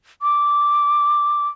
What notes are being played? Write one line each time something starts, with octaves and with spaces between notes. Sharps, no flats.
D6